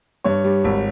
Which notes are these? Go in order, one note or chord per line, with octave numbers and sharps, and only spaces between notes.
G2 C#5
G3
G#1